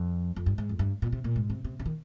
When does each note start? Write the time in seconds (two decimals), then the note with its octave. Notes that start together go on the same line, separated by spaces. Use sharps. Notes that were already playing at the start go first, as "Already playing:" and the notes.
Already playing: F2
0.36 F2
0.46 G2
0.58 G#2
0.69 F2
0.79 G2
1.02 A#2
1.12 C3
1.24 A#2
1.36 G#2
1.50 C3
1.64 C3
1.79 C#3
1.86 D#3